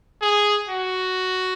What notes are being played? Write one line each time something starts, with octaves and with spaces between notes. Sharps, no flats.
G#4
F#4